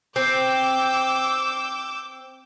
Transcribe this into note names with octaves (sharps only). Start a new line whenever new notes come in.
C4 D6 E6 G6